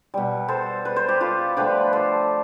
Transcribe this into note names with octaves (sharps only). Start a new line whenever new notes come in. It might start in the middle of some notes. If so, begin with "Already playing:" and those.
B2 G3
A4 C5
B4
C5
G4 B4
F4 A4
D3 F3 A3 G4 B4
A4 C5